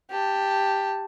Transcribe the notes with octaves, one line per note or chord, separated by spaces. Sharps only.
G4 A5